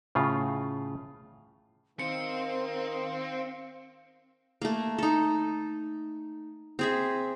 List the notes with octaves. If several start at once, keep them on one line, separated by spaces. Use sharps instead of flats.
A2 C#3 F4
D#3 C4 A#4 D#5 F5 C#7
A3 A#3
D#4 A4
C4 G#4 E5